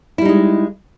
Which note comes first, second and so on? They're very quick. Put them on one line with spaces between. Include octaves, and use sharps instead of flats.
E4 G3 D#4 G#3